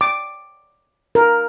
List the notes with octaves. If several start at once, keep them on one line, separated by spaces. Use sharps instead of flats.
D6
A#4